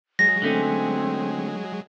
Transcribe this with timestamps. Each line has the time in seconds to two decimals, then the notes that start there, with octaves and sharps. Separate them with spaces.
0.19 F#3 G#3 G#4 A#6
0.42 D3 A3 C4 C#4